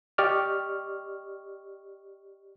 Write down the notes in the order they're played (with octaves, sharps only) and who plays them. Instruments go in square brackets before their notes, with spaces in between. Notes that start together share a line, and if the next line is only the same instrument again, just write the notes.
[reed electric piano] G4 D5 D#5 C#6 F6